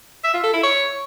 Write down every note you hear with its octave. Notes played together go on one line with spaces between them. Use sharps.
E5
F4
A4
E4
C#5